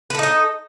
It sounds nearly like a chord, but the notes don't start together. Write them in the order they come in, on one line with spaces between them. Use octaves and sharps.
B4 A4 D#4 D#5